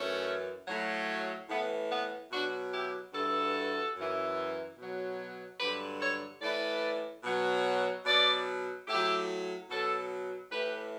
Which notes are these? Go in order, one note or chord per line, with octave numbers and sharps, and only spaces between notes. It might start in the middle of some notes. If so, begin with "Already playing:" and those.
Already playing: F#2 E3 A3 C#4
A2 F#3
A2 E3 B3
B3
B2 F#3 D4 F#4
E4 G4
G2 E3 F#4 A4
F#2 E3
B2 F#3
G2 D3 F#3 G4 B4
A4 C#5
A2 E3 B4 D5
B2 F#3
B2 F#3 B4 D5
A2 F#3 E4 G4
B2 F#3 F#4 A4
A2 E3 G4 B4